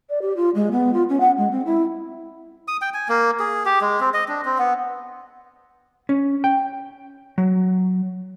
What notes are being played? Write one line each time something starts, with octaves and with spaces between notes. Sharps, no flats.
D5
G4
F4
G#3
B3
F4
C#4
F#5
G#3
C4
E4
D#6
G5
G#5
A#3
G#4
G4
G#3
C4
D#5
D4
C4
B3
C#4
G5
F#3